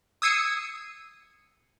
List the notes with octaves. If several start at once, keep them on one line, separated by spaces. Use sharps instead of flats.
D#6 E6 G#6 C7 C#7 D#7